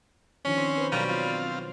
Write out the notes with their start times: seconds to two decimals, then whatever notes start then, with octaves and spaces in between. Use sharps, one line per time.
0.45 D#3 F3 C#4 D4
0.58 C4
0.78 B4 C5
0.92 B2 F#3 G3 A#4 C#5 F5
1.09 C4 F4